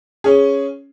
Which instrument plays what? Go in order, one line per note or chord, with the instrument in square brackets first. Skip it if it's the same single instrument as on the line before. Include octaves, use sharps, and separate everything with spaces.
[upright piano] C#4 G#4